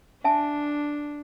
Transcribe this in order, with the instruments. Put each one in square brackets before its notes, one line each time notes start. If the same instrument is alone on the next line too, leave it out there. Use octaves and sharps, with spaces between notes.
[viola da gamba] D4 [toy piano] E5 G#5 A5